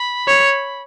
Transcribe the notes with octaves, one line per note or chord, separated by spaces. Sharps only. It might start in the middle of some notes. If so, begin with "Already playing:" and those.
Already playing: B5
C#5